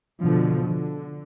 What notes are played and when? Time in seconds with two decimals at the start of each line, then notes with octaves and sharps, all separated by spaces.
0.21 B2 D3 F3
0.62 D3